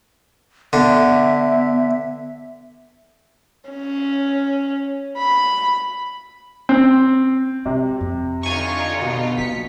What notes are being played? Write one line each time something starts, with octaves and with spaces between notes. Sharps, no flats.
D3 B3 E5
C#4
B5
C4
C3 G#3
F2
D3 D#4 F4 G#5 C#6
B2
A#3 B3 B6 C#7